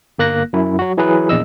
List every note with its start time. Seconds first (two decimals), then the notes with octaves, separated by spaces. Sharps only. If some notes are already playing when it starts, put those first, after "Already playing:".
0.19 G1 A#3 F#6 A#6
0.53 F#2 E4
0.79 F#3 F#4
0.98 E3 F#3 E4 G#4 B4
1.29 A#1 E2 D#5 E6